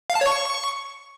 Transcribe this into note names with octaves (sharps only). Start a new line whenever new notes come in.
F5
A5
C#5
C#6